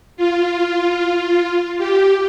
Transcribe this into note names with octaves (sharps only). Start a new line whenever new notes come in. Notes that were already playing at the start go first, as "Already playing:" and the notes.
F4
F4
G4